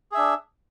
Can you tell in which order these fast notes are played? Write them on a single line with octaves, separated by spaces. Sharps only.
G#4 E5 D4